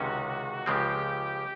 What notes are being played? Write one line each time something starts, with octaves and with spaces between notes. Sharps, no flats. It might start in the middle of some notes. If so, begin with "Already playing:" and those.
Already playing: C#2 C3 D#3 G#3 C#4 F#4
C#2 C#3 F3 G#3 C4 G4